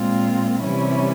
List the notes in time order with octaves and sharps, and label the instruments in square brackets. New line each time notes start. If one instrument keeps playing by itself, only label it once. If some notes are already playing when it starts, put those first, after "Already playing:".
Already playing: [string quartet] A#2 G#3 C4 F4
C3 E3 G3 C#4 E4